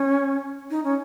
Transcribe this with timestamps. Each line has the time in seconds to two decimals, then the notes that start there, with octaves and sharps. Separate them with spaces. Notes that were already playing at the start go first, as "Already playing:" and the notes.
Already playing: C#4
0.70 D#4
0.84 C#4